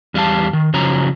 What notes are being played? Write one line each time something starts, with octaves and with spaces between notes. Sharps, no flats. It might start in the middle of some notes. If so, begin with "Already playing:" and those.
E2 G3 E4 F5 A5
D#3
C#3 F3 F#3 A#5